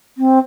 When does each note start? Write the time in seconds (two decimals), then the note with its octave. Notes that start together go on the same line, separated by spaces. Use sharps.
0.18 C4